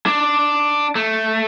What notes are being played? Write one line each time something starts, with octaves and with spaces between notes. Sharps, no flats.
D4
A3